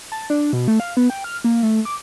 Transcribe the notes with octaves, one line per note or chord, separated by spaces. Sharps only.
A5
D4
B2
A3
F5
B3
G5
F6
A#3
A3
D6